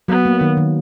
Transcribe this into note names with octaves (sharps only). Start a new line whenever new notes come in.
F#3 B3
A#3
D#3
D#3